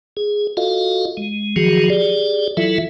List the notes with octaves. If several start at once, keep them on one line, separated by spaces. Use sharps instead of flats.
G#4
F4 F#4 A4 D#5 F5
G#3
D#3 F3 F#3 F#4 G#4
G4 G#4 D5
E3 F#3 E4 F4 A4 E5